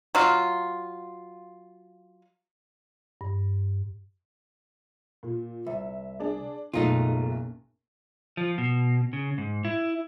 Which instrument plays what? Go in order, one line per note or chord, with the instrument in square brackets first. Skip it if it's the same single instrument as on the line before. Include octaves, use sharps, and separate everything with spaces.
[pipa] F#3 F4
[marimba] G2
[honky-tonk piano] A#2
[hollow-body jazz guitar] C2 [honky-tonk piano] E5
[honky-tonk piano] D4 G#4 D5
[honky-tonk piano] F#1 B1 B2 [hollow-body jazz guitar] A3 D#4 F4
[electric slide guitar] F3
B2
C#3
G#2
E4